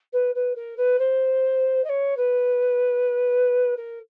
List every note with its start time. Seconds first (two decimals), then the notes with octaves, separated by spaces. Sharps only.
0.13 B4
0.35 B4
0.56 A#4
0.77 B4
0.99 C5
1.84 D#5
1.89 C#5
2.17 B4
3.77 A#4